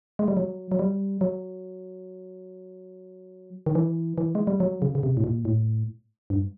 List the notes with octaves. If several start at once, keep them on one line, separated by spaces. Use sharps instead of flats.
G#3
G3
F#3
F#3
G3
F#3
D#3
E3
E3
G#3
G3
F#3
C#3
C#3
C3
A2
A#2
A2
G2